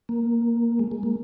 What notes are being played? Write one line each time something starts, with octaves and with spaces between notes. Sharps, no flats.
A#3
G#3
G#3
A#3